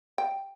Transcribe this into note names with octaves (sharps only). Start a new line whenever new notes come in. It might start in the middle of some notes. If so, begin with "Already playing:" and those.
G5